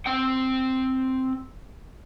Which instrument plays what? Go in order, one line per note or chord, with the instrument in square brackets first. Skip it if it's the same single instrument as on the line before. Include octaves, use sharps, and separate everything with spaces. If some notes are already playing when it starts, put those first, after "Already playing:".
[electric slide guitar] C4 G5